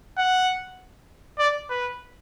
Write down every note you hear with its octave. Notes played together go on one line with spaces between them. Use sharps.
F#5
D5
B4